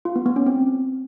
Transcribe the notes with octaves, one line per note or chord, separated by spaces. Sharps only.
F4
B3
B3
C#4
C4